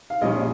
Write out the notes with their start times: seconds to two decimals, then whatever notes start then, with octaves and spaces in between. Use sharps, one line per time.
0.10 F5
0.21 A#1 A#2 G3 C#4 D#5